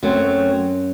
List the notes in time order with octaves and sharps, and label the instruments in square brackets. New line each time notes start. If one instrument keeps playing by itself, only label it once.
[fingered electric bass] F#2 [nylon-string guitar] F#3 A3 C4